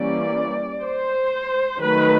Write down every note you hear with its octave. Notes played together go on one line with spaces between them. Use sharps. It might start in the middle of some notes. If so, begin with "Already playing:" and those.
Already playing: E3 G3 A#3 C#4 D5
C5
D#3 F#3 A3 B4